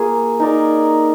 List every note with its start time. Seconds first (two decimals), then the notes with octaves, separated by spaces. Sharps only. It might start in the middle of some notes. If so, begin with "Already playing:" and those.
Already playing: A#3 F4 G#4
0.40 D#4 A#4 D5